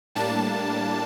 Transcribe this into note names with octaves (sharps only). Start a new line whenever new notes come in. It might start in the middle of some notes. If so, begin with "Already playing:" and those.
A2 G3 A#3 D4 A5